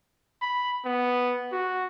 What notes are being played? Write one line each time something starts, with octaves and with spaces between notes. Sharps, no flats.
B5
B3
F#4